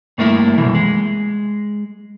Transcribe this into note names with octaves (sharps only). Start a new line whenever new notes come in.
G2 A3 A#3 E4
C2 F#2 B2 E3
G#3